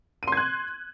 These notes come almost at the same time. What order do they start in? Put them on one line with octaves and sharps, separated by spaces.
D#7 C6 G#6 F#6